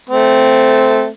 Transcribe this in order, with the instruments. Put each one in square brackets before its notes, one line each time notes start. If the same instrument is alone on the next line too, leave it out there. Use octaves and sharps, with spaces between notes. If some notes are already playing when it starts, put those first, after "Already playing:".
[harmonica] A3 C4